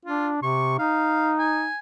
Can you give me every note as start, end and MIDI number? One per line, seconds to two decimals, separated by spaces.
0.05 0.40 62
0.05 0.29 65
0.42 0.78 48
0.42 0.76 85
0.79 1.68 63
0.79 1.33 77
1.39 1.79 80